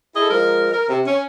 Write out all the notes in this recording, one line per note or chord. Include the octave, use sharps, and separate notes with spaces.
E4 G#4 A4 D#5
F3 G#3 A#4
A#4
C3
C#4